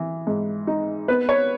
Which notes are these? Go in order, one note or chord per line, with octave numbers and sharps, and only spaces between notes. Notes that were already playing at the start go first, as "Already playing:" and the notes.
Already playing: E3
G#2
D#4
B3 B4
C#5